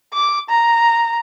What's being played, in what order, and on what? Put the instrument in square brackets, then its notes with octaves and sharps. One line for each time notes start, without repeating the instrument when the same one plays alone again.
[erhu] D6
A#5